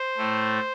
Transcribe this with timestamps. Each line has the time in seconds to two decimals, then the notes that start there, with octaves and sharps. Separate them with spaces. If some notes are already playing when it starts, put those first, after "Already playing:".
Already playing: C5
0.17 A2 A3